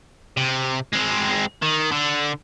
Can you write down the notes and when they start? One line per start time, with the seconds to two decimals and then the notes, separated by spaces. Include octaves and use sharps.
0.37 C3
0.93 G#3 C4
1.62 D#3
1.91 D3